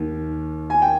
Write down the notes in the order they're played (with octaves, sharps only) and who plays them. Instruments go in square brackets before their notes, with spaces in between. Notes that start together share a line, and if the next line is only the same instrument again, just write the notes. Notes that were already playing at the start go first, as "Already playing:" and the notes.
Already playing: [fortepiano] D#2 D#3
G#5
G5